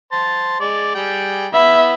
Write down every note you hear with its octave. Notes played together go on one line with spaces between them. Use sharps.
C5 A5
G#3 D5
G3 G#4 G5
B3 E4 E5 B5